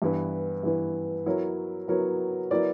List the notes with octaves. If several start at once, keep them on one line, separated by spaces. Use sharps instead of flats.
G2 E3 B3 E4 B4
G2 E3 B3 E4 B4
F#3 B3 E4 A#4 C#5
F#3 B3 E4 A#4 C#5
F#3 B3 E4 A#4 D5